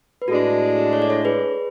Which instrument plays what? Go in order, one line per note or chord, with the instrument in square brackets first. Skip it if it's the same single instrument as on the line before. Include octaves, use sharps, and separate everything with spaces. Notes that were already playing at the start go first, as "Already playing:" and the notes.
[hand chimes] B4
[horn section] A2 G#3 D4 [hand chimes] F#4 A4
[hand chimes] C#5
D5
A4 C#5
G#4 B4